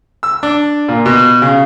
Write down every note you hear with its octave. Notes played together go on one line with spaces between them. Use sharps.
E6
D4
A#2
B2
C#3